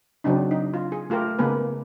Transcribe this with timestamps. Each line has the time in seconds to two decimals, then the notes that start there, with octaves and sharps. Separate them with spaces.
0.24 C#3 F#3 C4 D4 D#4
0.51 D#4
0.74 F4
0.92 G#4
1.10 A3 F4 G4 A#4
1.39 C#3 G#3 A#3 B3 B4